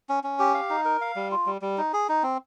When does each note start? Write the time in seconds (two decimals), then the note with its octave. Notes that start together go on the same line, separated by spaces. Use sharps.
0.09 C#4
0.24 C#4
0.39 G4
0.54 F5
0.70 D#4
0.85 A#4
1.01 F5
1.16 G3
1.31 F4
1.46 G3
1.62 G3
1.78 D#4
1.93 G#4
2.09 D#4
2.23 C4